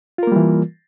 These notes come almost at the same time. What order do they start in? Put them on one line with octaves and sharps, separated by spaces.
F4 A#4 A#3 G3 E3